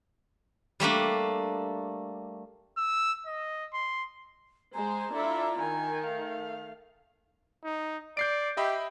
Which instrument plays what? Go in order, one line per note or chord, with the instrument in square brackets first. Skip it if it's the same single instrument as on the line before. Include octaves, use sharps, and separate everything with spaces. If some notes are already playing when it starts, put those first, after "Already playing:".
[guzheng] G3 A3 A#3 D4
[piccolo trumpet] E6
D#5
C6
[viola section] G#3 C5 [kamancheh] G#5 [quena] A#5
[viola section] D4 E4 F4 [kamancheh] A4 E5
[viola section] D#3 [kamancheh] G#5
[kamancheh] A3 F5
[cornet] D#4
[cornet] D5 [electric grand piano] G6 C7 D7
[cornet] G4 [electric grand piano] D#5 E5 B5